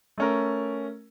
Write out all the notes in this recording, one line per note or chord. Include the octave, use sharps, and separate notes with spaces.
A3 C#4 A#4